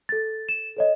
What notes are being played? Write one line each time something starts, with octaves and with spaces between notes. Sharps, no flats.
A4 A6
E7
A4 C#5 D#5